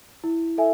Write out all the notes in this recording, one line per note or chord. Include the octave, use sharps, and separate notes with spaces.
E4
A4 E5 G#5